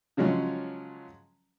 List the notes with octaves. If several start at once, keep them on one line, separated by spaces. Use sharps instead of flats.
C#3 F3 F#3 G#3 C#4